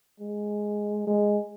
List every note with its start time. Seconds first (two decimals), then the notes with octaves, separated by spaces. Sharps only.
0.20 G#3
1.07 G#3